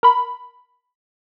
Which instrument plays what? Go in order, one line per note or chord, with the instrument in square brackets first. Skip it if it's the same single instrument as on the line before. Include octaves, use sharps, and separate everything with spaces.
[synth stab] A#4 B5